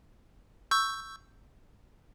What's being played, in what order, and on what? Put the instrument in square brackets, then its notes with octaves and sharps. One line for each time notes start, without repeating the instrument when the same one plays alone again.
[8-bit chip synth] C#6 E6 G6